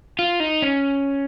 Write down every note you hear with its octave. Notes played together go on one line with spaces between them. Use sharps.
F4
D#4
C#4